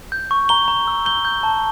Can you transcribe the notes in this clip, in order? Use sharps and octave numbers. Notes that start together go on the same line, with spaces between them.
G6
C#6
A#5 G7
A#5
E6
G6 G7
G6
A5